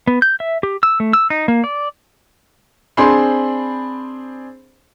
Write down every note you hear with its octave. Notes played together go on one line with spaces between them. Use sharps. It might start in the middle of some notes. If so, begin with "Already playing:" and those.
B3
G6
E5
G4
E6
A3
E6
D#4
A#3
D5
C4 D4 G#4 C5 B5 C6